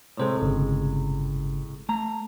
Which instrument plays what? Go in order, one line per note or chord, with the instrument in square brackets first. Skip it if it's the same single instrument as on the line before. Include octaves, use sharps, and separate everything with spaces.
[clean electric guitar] A2 C3 G#3 [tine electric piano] A4 C5 C#5
[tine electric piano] G1 C#3
[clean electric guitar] A3 A#5